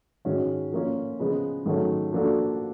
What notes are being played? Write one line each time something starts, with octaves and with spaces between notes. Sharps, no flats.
G#2 D#3 G#3 C#4 F#4
F3 A#3 C#4 F4
C#3 F3 G#3 B3
G#2 D#3 F#3 A3 C#4
F3 A#3 D4 F#4 A4